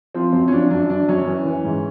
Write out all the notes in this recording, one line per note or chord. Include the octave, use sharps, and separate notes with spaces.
F3 C4
F#2 C4
C#4
F3 D4
F#2 D4
F#2 D4
F#2 C#4
E3
E3
G#2